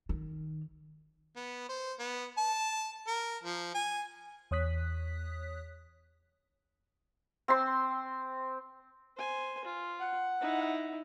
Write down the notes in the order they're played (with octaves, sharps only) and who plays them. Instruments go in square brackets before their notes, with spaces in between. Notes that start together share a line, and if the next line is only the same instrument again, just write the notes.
[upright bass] D#3
[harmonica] B3
C5
B3
A5
A#4
F3
G#5
[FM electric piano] E2 C#5 D#6 F#6 B6
[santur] C4 C6
[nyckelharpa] C5 G#5
F4
[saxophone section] F#5
[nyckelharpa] D#4 E4